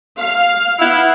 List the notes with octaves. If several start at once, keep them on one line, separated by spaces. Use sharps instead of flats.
F5
B3 E4